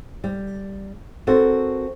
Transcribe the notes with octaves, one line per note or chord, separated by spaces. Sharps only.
G3
C4 F#4 A4 A#4